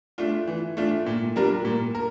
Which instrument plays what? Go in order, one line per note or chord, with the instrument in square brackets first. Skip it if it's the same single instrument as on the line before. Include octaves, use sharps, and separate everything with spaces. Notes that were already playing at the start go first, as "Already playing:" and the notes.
[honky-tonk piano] A3 D4 F4
E3
A3 D4 F4
A#2
G3 D4 F4 A#4
A#2
A#4